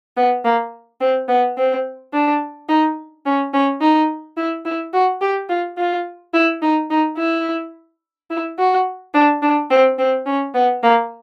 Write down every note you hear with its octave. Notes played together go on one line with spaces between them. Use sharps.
B3
A#3
C4
B3
C4
D4
D#4
C#4
C#4
D#4
E4
E4
F#4
G4
F4
F4
E4
D#4
D#4
E4
E4
F#4
D4
D4
C4
C4
C#4
B3
A#3